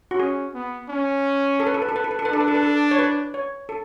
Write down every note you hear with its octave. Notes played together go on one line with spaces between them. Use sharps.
F#4
C#4 G#4
B3
C#4
A4
B4
A4
B4
A4
B4
A4
B4
A4
B4
D4 A4
B4
A4
B4
A4
C#5
B4
C#5
A4